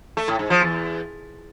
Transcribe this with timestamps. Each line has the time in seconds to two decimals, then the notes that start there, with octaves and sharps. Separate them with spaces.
0.17 A3
0.28 A2
0.39 G#2
0.50 F3
0.61 E2